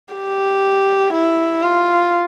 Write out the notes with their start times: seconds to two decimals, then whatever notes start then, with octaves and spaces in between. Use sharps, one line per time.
0.14 G4
1.14 E4
1.63 F4